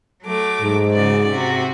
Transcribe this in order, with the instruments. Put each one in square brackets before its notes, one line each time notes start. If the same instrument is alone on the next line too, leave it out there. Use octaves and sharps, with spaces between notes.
[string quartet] F#3 A3 D6
[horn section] G#2
[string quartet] C#3 F#4 D5
C3 F#4